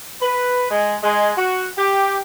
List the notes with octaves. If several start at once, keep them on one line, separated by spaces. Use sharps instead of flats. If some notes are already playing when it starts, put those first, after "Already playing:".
B4
G#3
G#3
F#4
G4